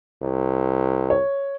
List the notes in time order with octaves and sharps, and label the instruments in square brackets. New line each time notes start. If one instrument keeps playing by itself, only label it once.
[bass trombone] C2
[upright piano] C#5